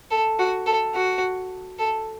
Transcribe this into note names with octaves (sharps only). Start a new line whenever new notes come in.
A4
F#4
A4
F#4
A4